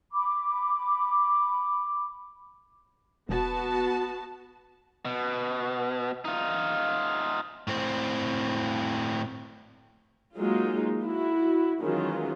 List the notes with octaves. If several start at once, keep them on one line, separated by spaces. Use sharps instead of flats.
B5 D6
E1 B3 F#4 A5
B2
D#4 F4
A2 C4
F#3 G#3 A#3 D#4 F4
E4 F#4
D#3 E3 F#3 G#3 C#4 F4